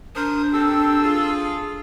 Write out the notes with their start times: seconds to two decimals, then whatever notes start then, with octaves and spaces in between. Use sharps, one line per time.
0.16 D4 A#4 C5 D#6
0.53 C4 G4 A4 E6
1.03 F4 G#4